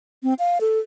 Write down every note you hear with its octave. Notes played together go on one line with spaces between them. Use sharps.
C4
F5
A4